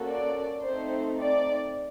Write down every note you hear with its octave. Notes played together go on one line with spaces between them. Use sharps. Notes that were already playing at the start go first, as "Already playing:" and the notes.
Already playing: A#3 C#4 F#4 A4
D5
A3 C4 D#4 C5
D5